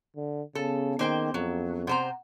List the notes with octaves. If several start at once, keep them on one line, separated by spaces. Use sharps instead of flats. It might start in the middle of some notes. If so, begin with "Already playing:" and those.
D3
C#3 B3 C#4 G#4 A4
D#3 A#3 C5 G5
F2 F#3
C3 C5 F#5 A#5